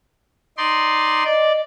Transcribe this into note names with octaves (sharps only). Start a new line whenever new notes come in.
D#4 D5 C6
D5 D#5